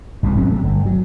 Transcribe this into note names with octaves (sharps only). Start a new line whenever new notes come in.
F1 C2 B2 G3
A1 F#3 C4 C#4
C3 E3 A3
G1
F#3